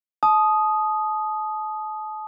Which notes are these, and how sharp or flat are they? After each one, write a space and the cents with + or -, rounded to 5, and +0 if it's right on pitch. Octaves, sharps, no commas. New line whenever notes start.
A5 -35 D#6 +0